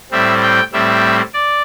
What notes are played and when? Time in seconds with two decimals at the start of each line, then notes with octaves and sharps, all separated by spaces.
0.11 A2 G3 C4 E5
0.42 G5
0.73 A2 G3 C4 E5
1.34 D5